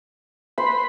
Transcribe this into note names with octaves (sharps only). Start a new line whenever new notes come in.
B4 C5 B5 C6